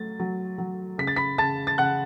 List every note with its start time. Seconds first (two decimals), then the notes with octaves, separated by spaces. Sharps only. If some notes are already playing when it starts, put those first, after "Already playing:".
Already playing: F#3 A3 A6
0.20 F#3
0.58 F#3
0.98 C#3 B6
1.07 A6
1.16 B5 B6
1.38 C#3 A5 A6
1.67 A6
1.78 C#3 F#5 F#6